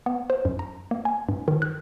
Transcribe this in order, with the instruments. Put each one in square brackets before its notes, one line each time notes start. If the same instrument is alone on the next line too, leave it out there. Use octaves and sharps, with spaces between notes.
[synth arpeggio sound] B3
C5
F#2
A#5
A#3
G#5
G2
D#3
F#6